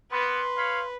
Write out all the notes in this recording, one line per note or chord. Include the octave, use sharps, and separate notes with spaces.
A#3 B3 B4 C6
C#5 F5 B5